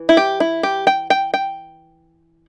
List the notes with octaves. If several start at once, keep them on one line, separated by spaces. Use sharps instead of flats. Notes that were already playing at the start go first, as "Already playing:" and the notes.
Already playing: E3
E4
G4
E4
G4
G5
G5
G5